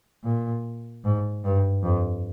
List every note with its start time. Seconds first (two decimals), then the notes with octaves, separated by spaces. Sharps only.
0.24 A#2
1.04 G#2
1.44 G2
1.83 F2